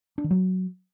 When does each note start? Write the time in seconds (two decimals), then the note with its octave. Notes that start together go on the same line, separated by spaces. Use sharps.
0.18 D4
0.24 D#3
0.31 F#3